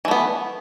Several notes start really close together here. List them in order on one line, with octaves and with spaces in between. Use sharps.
E3 A3 B3